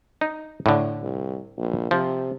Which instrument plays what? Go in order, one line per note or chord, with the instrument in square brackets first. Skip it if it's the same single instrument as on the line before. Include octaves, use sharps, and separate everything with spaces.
[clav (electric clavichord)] D#4
A2 D3
[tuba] C2
A#1
[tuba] C3 [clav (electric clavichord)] F3